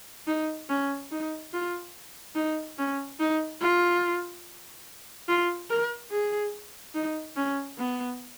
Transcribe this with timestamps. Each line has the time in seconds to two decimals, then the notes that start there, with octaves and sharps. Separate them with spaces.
0.27 D#4
0.69 C#4
1.11 D#4
1.53 F4
2.35 D#4
2.78 C#4
3.20 D#4
3.61 F4
5.28 F4
5.69 A#4
6.11 G#4
6.94 D#4
7.36 C#4
7.78 B3